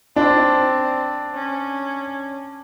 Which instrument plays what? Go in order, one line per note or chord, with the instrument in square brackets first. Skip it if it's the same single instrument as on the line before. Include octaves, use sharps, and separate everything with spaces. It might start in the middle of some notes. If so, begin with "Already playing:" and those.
[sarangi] C4 [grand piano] D4
[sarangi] C#4